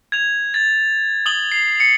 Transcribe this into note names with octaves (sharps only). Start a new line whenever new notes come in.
G#6 F7
A6
D#6 F#7 G7
C7
C#7